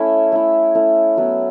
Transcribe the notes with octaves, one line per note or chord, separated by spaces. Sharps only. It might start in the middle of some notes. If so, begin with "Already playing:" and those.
Already playing: A3 C#4 E4 E5
A3 E4
A3 C#4 E4
F#3 B3 E4